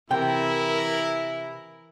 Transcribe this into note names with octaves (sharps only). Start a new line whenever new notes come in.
C3 E3 E4 A#4 G5